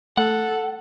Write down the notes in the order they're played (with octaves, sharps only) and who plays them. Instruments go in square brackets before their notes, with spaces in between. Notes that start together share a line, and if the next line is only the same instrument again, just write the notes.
[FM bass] A3 [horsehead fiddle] A4 [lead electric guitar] F#5